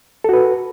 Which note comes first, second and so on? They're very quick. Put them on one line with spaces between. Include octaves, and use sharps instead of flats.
A4 F#4 B4